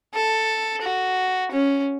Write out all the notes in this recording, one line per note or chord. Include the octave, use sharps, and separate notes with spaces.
A4
F#4
C#4